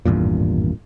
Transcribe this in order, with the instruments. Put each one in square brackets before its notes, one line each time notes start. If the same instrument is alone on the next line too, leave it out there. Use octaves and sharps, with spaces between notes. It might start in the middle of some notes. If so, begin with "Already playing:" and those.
[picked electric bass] G#1 E2 G2 A#2